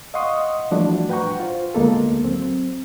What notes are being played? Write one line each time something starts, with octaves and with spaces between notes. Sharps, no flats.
D#5 F5 F#5 C6 C#6 D#6
E3 F3 G3 A3 D4 F#4
B4 F#5 G5 A#5 C#6
F4 C5
D2 G#3 A#3 B3 A4
F#3 C4